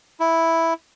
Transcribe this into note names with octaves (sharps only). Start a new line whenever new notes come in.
E4